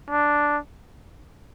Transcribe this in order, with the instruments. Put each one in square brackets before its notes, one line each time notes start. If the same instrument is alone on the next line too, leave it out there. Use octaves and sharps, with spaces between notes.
[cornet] D4